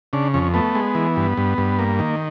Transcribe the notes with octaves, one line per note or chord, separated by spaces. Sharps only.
C#3 D4
F2 C#4
A3 B3
G#3
E3
G2
G2
G2
A#3
D#3